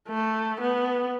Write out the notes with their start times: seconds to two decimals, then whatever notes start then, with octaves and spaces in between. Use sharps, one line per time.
0.09 A3
0.61 B3